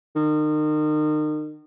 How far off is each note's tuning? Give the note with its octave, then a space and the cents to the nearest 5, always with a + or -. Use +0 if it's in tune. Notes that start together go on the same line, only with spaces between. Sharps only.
D#3 -35